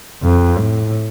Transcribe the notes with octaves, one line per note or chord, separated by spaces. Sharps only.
F2
A2